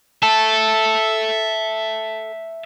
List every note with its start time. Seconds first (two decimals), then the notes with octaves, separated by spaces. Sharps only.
0.23 A4 E5 A5